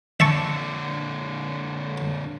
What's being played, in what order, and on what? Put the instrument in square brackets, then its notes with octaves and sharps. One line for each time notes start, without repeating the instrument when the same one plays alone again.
[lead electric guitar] A#2 D3 [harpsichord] E5 A5 C#6